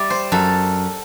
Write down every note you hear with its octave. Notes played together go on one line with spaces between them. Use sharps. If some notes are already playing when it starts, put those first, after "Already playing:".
Already playing: G3 D5 E5
C5
F#2 A4